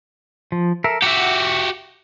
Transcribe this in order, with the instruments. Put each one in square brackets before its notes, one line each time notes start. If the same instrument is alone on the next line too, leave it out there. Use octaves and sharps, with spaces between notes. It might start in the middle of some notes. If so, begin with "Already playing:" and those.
[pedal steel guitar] F3
A4 A#4 E5
[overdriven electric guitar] F#4 G4 [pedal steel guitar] E5 F#5